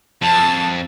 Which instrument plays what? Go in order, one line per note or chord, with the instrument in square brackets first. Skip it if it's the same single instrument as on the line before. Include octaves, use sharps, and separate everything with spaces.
[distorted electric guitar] F2 [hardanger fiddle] A5